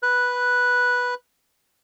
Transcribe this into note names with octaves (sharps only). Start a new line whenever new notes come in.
B4 F#6